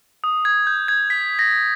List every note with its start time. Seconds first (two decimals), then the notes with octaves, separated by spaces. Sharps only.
0.24 D#6
0.45 G#6
0.67 G6
0.88 G#6
1.10 B6
1.39 A#6